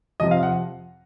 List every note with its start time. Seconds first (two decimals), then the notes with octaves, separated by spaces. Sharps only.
0.20 F2 C3 F3 D#5
0.31 F5
0.43 F#5